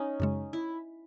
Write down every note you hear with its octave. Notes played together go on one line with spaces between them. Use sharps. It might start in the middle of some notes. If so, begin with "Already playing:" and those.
Already playing: C#4 D#4
F#2 C#3 G#3
E4